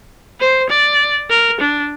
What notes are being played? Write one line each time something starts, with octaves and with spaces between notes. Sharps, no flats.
C5
D5
A#4
D4